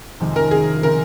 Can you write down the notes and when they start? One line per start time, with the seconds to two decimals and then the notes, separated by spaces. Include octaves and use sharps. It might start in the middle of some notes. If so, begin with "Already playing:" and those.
0.20 F2 C3 D#3 G#3
0.36 A#4
0.51 G#4
0.83 C#3 G#3 C4 A#4